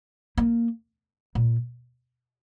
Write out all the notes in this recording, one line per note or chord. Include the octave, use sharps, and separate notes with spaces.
A#3
A#2